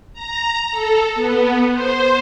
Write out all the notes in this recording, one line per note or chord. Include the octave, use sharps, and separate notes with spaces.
A#5
A4
B3
C5